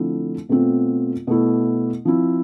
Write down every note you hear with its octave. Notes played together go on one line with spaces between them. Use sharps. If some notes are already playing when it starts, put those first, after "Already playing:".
Already playing: D3 F3 A3 C4 E4
B2 A3 C4 F4
B2 A3 E4
F3 C4 E4